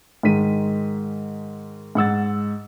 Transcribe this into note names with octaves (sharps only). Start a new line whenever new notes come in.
G#2 D#3 G#3 B6 D#7
G#2 F#5 E6 A6